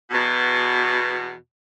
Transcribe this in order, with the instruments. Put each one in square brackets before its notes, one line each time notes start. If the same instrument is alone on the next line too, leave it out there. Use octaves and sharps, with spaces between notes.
[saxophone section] E2 B2